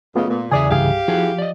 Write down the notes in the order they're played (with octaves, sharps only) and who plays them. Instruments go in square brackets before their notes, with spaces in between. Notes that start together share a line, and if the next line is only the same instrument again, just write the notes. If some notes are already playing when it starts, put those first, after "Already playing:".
[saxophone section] F#2 C#3 G#3 [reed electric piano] A3 B3 F4
[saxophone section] A#2
[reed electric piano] E2 D5 G#5 [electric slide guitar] C#3 E3 E5 [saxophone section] G#4
[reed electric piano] C2 G2 G#4 [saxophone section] G4 F5
[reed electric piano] F3 [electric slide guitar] E4 F#4 G#4
[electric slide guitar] D5 D#5